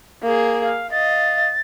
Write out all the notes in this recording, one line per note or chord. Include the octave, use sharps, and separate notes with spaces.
A#3 G#4
F5
D#5 F5 A6